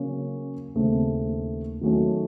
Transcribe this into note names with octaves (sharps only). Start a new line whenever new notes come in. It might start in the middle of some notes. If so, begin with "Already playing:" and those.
Already playing: C#3 F#3 A#3 C#4
D#2 C#3 A3 C4
D#3 F#3 A3 C#4